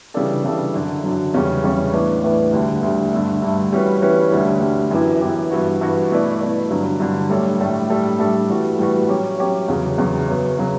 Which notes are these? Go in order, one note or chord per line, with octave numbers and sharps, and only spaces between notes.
C#3 E3 G3 D4 A4
C#3 E3 G3 D4 A4
F#2 D3 F#3
F#2 D3 F#3
E2 C#3 G3 C#4
E2 C#3 G3 C#4
A2 E3 B3 D4
A2 E3 B3 D4
D2 D3 G3
D2 D3 G3
G2 D3 A3
G2 D3 A3
E3 G3 C#4 F#4 B4
E3 G3 C#4 F#4 B4
D2 D3 G3 D4
D2 D3 G3 D4
F#2 E3 B3 E4 G4
F#2 E3 B3 E4 G4
G2 E3 B3 F#4
G2 E3 B3 F#4
B2 A3 E4 B4 D5
B2 A3 E4 B4 D5
G2 D3 F#3
G2 D3 F#3
A2 G3 D4 A4 C#5
A2 G3 D4 A4 C#5
A2 G3 D4 A4
A2 G3 D4 A4
A2 E3 G3 B3 F#4
A2 E3 G3 B3 F#4
F#3 C#4 G4 C#5
F#3 C#4 G4 C#5
E2 C#3 F#3
E2 C#3 F#3
F#2 C#3 F#3 B3
C#3 F#3 B3